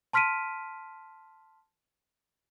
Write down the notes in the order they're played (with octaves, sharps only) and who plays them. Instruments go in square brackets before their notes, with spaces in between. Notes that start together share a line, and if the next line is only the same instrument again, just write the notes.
[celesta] A5 C6 F6 B6 D7 D#7